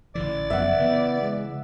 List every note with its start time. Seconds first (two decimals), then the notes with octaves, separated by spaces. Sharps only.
0.15 A1 D3 E3 D5
0.50 F#1 F#2 F3 B3 E5 F#5
0.80 C#3 E3 B3
1.21 G#3